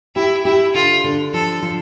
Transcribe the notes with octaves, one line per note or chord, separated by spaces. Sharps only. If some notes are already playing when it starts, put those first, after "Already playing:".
E4 G4
E4 G4
D3 F4
D3
F3 A4
F3